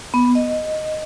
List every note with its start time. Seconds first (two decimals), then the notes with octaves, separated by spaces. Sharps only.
0.14 B3
0.35 D#5